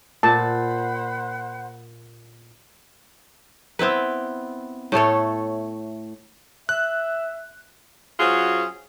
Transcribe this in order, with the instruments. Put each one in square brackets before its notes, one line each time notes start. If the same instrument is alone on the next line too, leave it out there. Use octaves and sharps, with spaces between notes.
[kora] A#2 [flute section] C5 F#5 B5 [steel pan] A5
[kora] B3 C4 E4 B4
A2 A3 A4 C#5
[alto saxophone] E5 [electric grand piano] F#6
[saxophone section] F#3 C#4 F4 F#4 G#4 C5